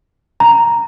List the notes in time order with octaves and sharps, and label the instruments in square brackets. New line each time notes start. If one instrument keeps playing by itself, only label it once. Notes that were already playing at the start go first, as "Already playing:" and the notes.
[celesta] A#5